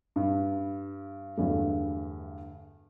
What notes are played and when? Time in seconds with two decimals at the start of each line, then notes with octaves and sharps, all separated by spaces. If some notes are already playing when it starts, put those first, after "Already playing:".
0.16 G2
1.37 E2 G2 D3 F#3 A3